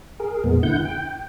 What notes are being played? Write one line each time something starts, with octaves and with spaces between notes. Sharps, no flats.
G#4 A#4
F2 A#2 G#3 B3
D3 E4 F#5 G6
G5